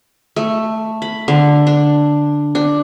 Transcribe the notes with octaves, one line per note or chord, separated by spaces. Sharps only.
A3
B5
D3
D4
D4